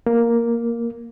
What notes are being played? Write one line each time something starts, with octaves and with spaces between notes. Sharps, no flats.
A#3